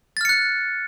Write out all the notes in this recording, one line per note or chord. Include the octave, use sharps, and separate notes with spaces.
F6 F#6 A6 C#7